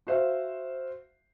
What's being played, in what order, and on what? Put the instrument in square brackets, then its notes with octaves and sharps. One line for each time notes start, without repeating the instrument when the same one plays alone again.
[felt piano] F#4 C5 E5 F5